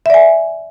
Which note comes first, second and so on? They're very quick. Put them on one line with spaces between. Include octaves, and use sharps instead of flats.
E5 D5 G#5